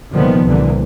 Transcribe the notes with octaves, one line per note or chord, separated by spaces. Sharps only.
C2 A#2 D3 D#3 F3 B3
C2 A#2 D3 E3